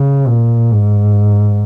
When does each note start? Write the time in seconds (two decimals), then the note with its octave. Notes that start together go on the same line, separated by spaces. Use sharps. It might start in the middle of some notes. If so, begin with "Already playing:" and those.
Already playing: C#3
0.28 A#2
0.72 G#2